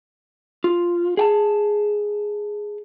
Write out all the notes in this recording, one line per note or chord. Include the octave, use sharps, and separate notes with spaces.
F4
G#4 G5 A5